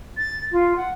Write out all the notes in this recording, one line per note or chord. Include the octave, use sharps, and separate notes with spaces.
A6
F4
F#5